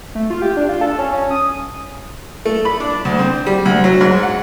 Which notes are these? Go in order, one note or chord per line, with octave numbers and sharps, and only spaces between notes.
A3
F4
G4
D4
F4
A4
C#4
C#4
D#6
A3
B5
D4
D2
C4
G3
D2
F#3
G#2
F#5